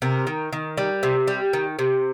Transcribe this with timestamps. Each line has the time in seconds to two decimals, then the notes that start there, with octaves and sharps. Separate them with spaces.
0.02 C3 A#4
0.27 D#3
0.53 D#3
0.78 G3
1.03 C3
1.28 G3
1.53 D#3
1.79 C3